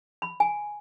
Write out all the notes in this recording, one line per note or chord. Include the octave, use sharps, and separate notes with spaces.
B5
G#5